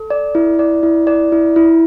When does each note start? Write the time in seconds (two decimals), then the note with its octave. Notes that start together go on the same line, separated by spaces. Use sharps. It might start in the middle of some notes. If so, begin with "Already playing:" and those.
Already playing: A4
0.10 D5
0.35 E4
0.59 D5
0.83 E4
1.07 D5
1.32 E4
1.56 E4